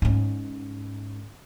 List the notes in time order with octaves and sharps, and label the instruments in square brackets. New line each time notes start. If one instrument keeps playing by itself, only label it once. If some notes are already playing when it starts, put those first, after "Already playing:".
[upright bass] G#2 C#4